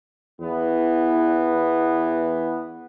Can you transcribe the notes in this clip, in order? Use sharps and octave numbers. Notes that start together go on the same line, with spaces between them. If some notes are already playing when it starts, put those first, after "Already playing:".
E2 E3 B3